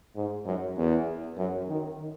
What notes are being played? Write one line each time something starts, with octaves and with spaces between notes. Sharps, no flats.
G#2
F#2
E2
F#2
D#3